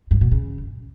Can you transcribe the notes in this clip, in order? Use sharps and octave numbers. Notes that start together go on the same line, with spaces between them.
G2
B2
C#3